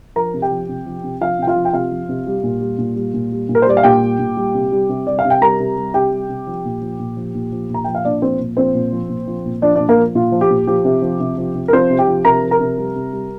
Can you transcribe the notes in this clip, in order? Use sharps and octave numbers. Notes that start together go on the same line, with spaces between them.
F3 A#4 A#5
C3
G4 G5
F3
C3
F3
C3
F3 F4 F5
C3 G5
F4 F5
F3
G5
C3 F4 F5
F3
C3
G3
A#2
G3
A#2
G3
A#2
G3
A#2
A#4
C5
G3 D5
F5
A#2 G4 G5
G3
A#2
G3
C3
G3
C3
G3 D5
F5
C3
G5
G3 A#4 A#5
C3
G3
C3 G4 G5
G3
C3
F3
A#2
F3
A#2
F3
A#2
F3
A#2 A#5
F3 G5
F5
A#2 D4 D5
F3 C4 C5
A#2
F3 C4 C5
A#2
F3
A#2
F3
A#2
F3 D4 D5
A#2 D4 D5
A#3 A#4
F3
A#2 F4
F3
G4
A#2
F3 G4
C3
F3
C3
F3
C3
A#4
F3 C4 C5
C3
G4 G5
F3
C3 A#4 A#5
F3
A#4 A#5
C3
G3
C3
G3